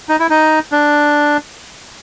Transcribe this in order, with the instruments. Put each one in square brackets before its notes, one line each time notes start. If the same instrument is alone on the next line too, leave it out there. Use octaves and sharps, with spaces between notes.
[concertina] D#4
E4
D#4
D4